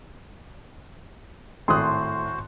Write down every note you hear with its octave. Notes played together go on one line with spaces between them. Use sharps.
G#1 A2 F#4 C5 C6 D#6 F#6